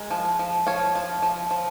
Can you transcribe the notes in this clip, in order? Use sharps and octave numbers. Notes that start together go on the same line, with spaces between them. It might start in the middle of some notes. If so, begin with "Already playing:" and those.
Already playing: G#3 A#4
F3
F3
F3 C#5 F5
F3
F3
F3